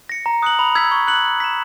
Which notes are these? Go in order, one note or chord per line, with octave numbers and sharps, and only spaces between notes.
A#6 C#7
A#5
D#6 F#6 C#7 F#7
B5
E6 G#6 B6
C#6
F#6 C#7 F#7
F#6
B6 E7